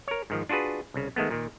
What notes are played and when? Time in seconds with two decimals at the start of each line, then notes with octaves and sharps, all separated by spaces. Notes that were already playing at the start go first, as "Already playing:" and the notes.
0.08 A#4 C#5
0.30 G#2 D#3 F3
0.49 D4 F4 F#4 G#4 B4
0.94 C2 C#3
1.16 D#3 G#3 A3 B3
1.30 A#2 D#3